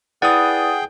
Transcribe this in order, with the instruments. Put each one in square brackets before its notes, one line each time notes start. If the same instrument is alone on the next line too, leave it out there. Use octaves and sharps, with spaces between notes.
[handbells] E4 B4 D5 [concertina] G#4 G5 [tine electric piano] F#5 D#6